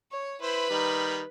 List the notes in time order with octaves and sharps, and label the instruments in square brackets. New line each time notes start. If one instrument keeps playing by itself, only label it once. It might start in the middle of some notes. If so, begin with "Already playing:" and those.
[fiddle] C#5
[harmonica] E4 C5 [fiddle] B4 B5
[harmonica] D#3 G3 D#4